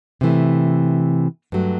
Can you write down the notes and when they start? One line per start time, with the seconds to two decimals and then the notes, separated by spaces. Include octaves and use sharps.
0.21 C3 E3 A3
1.52 G2 F#3 A3